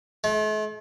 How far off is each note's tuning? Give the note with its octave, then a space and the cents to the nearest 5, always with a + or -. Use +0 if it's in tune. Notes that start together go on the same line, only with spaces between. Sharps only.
A3 -45